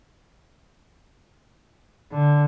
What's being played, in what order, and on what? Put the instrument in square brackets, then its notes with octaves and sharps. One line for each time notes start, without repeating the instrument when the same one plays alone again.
[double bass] D3